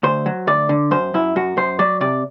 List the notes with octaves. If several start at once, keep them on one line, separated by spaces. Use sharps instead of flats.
D2 C5
F#3
D2 D5
D3
F#2 C5
F#2 E4
F#2 F#4
F#2 C5
F#3 D5
C3 D5